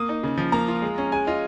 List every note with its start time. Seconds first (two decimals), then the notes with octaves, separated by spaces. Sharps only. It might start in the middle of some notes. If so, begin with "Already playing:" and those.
Already playing: A#3 D#6
0.09 D#4
0.23 C#3
0.37 F3
0.52 A#3 A#5
0.68 F4
0.82 G#3
0.98 C#4
1.12 G#3 G#5
1.27 F4 D#5